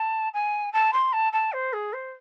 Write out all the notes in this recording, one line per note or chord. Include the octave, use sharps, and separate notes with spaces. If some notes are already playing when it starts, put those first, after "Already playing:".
Already playing: A5
G#5
A5
C6
A5
A5
C5
G#4
C5